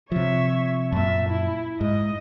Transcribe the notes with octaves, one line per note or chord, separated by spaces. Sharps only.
C3 F3 C#5 E5
F#2 A#2 E5 A5
E4
G#2 D#5